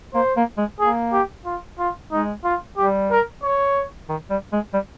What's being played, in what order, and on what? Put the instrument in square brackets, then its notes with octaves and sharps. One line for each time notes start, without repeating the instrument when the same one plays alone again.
[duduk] A#3 [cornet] C5
[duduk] A#3
G#3
[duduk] A#3 [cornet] G#4
[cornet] G4
F4
F4
[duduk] G#3 [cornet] D#4
[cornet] F4
[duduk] G3 [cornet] G4
[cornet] A#4
C#5
[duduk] D#3
G3
G#3
G3